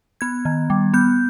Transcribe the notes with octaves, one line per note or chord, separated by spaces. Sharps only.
B3 G#6
D#3
G3
B3 G6